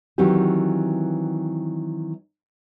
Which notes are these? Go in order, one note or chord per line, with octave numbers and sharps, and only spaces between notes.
D#3 E3 F#3 C4 G4